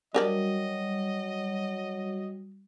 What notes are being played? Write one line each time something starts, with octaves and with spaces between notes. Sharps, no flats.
F#3 G3 D4 F#4 A#4 D5 D#5